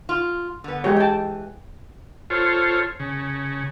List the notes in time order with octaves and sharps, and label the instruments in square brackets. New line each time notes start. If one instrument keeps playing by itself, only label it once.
[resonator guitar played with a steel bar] F4
D3 B3
[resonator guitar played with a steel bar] E3 [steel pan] G#3 G4 C#5
[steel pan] G5 A5
[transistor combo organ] F4 A4 C5 C#5
C#3